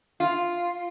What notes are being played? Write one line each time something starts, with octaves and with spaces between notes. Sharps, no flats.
F4